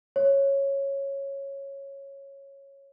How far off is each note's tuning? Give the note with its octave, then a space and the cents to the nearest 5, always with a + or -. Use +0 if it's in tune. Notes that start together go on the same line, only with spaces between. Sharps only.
C#5 -10